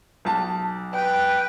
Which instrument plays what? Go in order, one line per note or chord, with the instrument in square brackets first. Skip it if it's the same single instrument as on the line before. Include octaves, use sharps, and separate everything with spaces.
[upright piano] B1 A5
[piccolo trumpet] B4 [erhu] G5